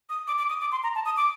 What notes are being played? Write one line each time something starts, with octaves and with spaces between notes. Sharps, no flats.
D#6
D6
D6
D#6
D6
C6
A#5
A5
D#6
D6